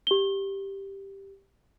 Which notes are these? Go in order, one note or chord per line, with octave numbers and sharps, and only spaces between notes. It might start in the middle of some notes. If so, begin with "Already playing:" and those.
G4 G7